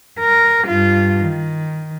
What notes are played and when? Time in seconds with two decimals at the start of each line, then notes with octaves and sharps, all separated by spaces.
0.20 A#4
0.68 G2 F4
1.21 D#3